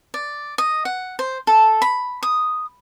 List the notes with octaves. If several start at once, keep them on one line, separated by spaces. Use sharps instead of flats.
D5
D#5
F#5
C5
A4
B5
D#6